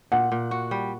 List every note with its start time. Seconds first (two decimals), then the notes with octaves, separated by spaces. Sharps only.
0.12 A#2 F#5
0.32 A#2
0.51 F#4
0.71 G3